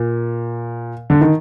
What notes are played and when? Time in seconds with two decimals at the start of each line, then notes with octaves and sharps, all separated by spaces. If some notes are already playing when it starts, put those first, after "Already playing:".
Already playing: A#2
1.10 D3
1.21 D#3